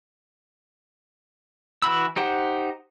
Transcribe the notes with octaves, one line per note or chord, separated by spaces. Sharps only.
E3 F#4 B5 E6
D#4 G4 C5 F#5